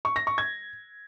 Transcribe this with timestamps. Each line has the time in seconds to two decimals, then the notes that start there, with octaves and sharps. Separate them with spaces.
0.05 C#6
0.16 A#6
0.27 C#6
0.38 G#6